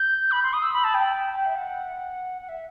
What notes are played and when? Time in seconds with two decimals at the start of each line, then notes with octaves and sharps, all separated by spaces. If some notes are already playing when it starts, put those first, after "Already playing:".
Already playing: G6
0.31 B5
0.43 C6
0.53 D#6
0.62 E6
0.73 B5
0.84 A5
0.94 G5
1.46 E5
1.55 F#5
2.41 F#5
2.48 E5